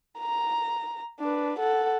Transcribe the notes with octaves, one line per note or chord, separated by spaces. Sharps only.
A#5
D4 B4
A4 F#5